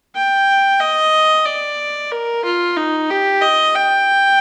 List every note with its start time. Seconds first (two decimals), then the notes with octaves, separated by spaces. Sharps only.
0.15 G5
0.80 D#5
1.46 D5
2.12 A#4
2.45 F4
2.77 D#4
3.10 G4
3.42 D#5
3.75 G5